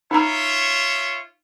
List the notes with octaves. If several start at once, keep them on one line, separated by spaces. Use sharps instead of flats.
D#4 F4 C#5 E5 A#5